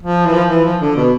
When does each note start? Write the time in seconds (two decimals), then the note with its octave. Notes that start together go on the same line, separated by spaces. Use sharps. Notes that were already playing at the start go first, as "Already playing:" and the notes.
0.03 F3
0.25 E3
0.33 F3
0.49 E3
0.65 F3
0.81 D3
0.96 B2